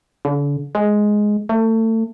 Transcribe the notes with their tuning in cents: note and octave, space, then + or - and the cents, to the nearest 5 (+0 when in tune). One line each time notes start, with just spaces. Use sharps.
D3 -40
G#3 +5
A3 +30